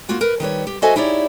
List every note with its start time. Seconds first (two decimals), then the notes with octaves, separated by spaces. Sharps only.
0.09 A#3 F4 F#4 F#5
0.21 A#4 B4
0.40 D#3 G3 B4 C#5
0.67 G4
0.82 F#4 A4 C5 D#5 E5 G#5
0.96 D#4 E4 G4 G#4 C#5 D5